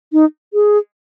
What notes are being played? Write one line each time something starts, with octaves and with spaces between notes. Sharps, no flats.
D#4
G#4